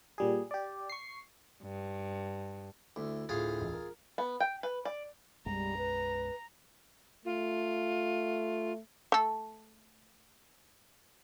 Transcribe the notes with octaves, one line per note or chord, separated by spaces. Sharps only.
A#2 G3 G#4
G4 D5
C#6 C7
G2
D2 E4
D2 A2 F4 G#4 F5
E1
A#4
B3
G5
B4
D5
B1 F#2 G3 G#3 A#5
B4
A3 F4
A3 A4